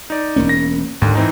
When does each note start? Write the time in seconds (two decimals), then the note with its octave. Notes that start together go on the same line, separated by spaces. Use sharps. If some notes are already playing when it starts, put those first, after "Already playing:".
0.10 D#4 D5
0.36 E1 A#3 C#4
0.49 A#6
1.02 D#2 G#2 D3
1.15 E3 C4 D#4